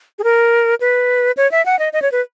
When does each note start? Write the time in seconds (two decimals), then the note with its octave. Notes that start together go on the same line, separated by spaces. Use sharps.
0.19 G#4
0.24 A#4
0.81 B4
1.37 C#5
1.51 E5
1.66 F#5
1.79 D#5
1.93 D#5
2.02 C#5
2.12 B4